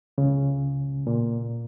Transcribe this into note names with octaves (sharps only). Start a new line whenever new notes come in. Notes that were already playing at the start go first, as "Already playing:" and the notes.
C#2 C#3
A#2